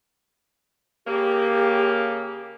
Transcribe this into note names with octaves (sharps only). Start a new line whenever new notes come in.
C#3 A#3 G4